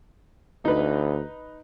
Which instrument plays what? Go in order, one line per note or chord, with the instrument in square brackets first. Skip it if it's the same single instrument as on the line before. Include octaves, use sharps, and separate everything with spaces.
[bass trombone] D2 [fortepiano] D#4 B4